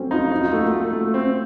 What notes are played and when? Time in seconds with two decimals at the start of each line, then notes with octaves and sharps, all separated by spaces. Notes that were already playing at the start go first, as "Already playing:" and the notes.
Already playing: F#3 A3 C4 C#4
0.11 D#4 F4
0.31 D#4 F#4
0.41 F4
0.52 A3 F#4
0.63 F4
0.73 A3
0.93 A3
1.14 C4